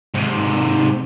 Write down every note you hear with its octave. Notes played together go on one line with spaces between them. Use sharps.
G#2 C3